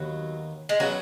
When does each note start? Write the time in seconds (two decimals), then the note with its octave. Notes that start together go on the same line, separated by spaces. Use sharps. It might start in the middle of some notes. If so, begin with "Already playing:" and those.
Already playing: D#2 D#3 F#3 B3 D#4
0.69 G#3
0.80 C#3 F#3 B3 F#4